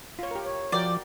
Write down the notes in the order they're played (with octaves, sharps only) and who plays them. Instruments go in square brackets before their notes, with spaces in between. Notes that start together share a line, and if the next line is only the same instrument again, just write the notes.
[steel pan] F4 C#5
G4 A#4
[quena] C#5
[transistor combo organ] F3 [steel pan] F#4 A#4 G5 [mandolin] D5